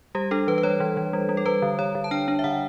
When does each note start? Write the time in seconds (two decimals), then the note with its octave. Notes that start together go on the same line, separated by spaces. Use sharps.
0.15 G3 G4
0.31 D4 A4
0.47 E3 B4
0.58 B4
0.63 G3 C#5
0.80 E3
0.97 E3
1.13 G3
1.29 G3
1.37 A4
1.46 G3 B4
1.62 D3
1.79 D3 C#5
1.95 D3
2.04 A5
2.11 D4 G5
2.28 D4
2.39 E5
2.44 D3 F#5